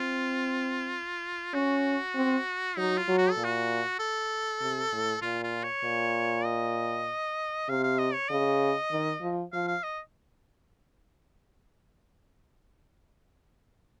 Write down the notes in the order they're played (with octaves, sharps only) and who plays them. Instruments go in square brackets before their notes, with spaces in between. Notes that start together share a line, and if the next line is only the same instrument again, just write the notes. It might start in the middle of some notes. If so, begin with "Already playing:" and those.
Already playing: [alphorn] C4 [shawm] F4
[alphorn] C#4 [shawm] F#4
[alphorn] C4
[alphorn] F#3 [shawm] D#4
[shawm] F4
[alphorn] F#3
[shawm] F#4
A4
[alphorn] A#2
[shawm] F#4
A4
[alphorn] C3
A2
[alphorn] A#2 [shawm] F4
[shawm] F4
C#5
[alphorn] A#2
[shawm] D#5
[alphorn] C3 [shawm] F5
[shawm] F5
D#5
C#5
[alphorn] C#3 [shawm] D#5
[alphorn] D#3
F3
[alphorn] F3 [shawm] F5
[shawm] F5
D#5